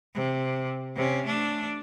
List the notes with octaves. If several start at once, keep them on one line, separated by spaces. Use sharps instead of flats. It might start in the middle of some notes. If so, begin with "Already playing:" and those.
C3
C3 C#4
A3 D4